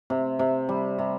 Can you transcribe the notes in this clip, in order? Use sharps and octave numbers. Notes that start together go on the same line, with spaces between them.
C3
C3
G3
C3